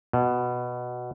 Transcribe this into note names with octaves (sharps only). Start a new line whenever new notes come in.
B2